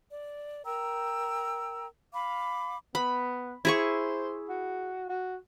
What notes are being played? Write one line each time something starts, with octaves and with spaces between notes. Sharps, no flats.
D5
A#4 G5 A#5 E6
F5 B5 D6
B3 B5
E4 G#4 C5 C#6
F#4
F#4